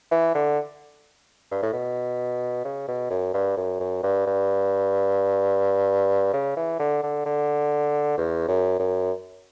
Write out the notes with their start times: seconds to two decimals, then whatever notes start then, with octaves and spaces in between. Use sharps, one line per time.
0.11 E3
0.35 D3
1.51 G2
1.62 A2
1.73 B2
2.65 C#3
2.88 B2
3.10 F#2
3.34 G2
3.57 F#2
3.80 F#2
4.03 G2
4.26 G2
6.33 C#3
6.56 E3
6.79 D3
7.03 D3
7.25 D3
8.18 E2
8.48 F#2
8.79 F#2